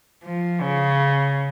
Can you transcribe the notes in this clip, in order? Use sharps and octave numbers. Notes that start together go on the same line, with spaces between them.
F3
C#3